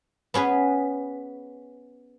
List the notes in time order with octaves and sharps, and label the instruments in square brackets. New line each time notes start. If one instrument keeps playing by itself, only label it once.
[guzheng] B3 C#4 G#4 B4